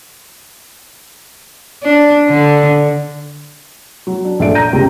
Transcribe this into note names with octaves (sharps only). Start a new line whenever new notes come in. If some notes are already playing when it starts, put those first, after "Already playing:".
D4
D3
F#3
D4
A#1 A4 D5 E5 D7
A#5 G6 A#6 D#7
C#2 C3 G4